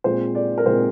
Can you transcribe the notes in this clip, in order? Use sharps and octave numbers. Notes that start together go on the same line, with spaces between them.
A#2 G#3 C4 C5
D5
A#4
A#2 G#3 C4 C5